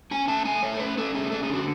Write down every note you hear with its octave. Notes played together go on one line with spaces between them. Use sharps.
C#4 G#5
A3 A5
A3 G#5
A3 C#5
A4
C#4 B4
C#4 A4
A3 G#4
C#4 A4
G#4
D3 F#4